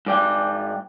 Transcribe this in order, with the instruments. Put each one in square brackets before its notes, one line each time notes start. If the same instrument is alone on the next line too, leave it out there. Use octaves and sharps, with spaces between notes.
[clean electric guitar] G#2 D5 G5